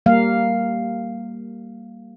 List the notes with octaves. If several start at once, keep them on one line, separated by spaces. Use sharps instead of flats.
G3 A#3 F5